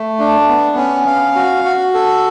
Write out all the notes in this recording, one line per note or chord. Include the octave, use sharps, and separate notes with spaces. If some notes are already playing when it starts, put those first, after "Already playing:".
Already playing: A3
D4
B3
C#4
F5
F#4
F#4
A4